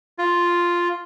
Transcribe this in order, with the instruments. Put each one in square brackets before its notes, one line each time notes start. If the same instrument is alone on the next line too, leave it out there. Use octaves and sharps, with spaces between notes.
[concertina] F4